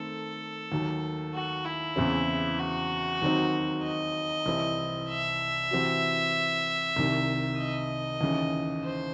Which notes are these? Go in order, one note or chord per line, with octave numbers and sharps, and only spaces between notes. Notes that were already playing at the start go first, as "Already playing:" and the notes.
Already playing: D#3 A3 C4 A4
D#2 D#3 F#3
F#4
E4
E2 C#3 E3 C4
F#4
D#2 D#3 F#3 C4 D#4
D#5
C2 C3 E3 C4 E4
E5
C3 E3 C4 F#4
C2 C3 D#3
D#5
D#2 C#3 E3
C5